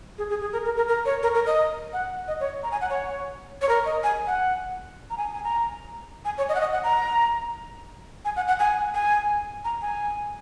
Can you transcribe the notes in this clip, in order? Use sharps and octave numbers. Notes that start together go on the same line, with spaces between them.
G#4
G#4
G#4
A#4
A#4
A#4
A#4
C#5
A#4
A#4
D#5
F#5
D#5
C#5
A#5
G#5
F#5
C#5
C#5
A#4
D#5
G#5
F#5
A#5
G#5
G#5
A#5
G#5
C#5
D#5
F#5
D#5
F#5
A#5
G#5
F#5
F#5
G#5
G#5
A#5
G#5